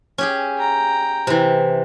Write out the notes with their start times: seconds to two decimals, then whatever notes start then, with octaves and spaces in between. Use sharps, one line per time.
0.18 C#4 G4 G#4
0.58 G5 A#5
1.27 C3 E3